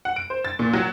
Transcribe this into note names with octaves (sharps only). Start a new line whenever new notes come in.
F#5
D7
C5
A6
A#2
F#3